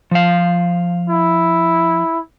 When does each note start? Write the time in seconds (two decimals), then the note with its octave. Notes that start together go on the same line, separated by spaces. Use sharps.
0.11 F3 F5
1.10 E4